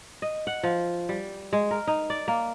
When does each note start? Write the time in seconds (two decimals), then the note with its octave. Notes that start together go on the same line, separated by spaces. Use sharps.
0.22 D#5
0.47 F#5
0.63 F3
1.09 G3
1.53 G#3
1.71 A#4
1.87 D#4
2.10 D5
2.28 A#3